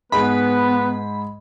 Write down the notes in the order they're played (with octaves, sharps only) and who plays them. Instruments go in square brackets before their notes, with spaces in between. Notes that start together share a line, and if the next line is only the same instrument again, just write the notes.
[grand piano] G#2 G#4 [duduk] B3 [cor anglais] B4 [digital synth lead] B5